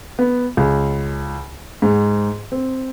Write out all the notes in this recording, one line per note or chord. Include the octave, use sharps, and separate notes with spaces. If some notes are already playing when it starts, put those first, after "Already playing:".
B3
C#2
G#2
C4